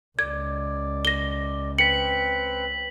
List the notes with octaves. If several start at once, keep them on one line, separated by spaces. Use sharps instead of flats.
C#2 D5 G#6
A#6 G7
C4 B4 G5 B6 C#7 F#7